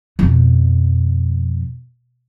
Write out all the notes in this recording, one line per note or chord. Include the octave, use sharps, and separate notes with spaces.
F2 B2